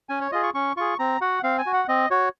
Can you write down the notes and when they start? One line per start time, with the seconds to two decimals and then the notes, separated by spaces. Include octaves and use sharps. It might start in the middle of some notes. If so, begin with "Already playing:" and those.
0.09 C#4 G#5
0.21 C#5
0.32 F4 G#4 D#5
0.43 C#6
0.54 C#4 C#6
0.77 F4 G#4 C#6
0.99 C4 A#5
1.21 F#4 F#5
1.43 C4 F5
1.58 G#5
1.66 F#4
1.73 F#5
1.88 C4 D#5
2.11 F#4 C#5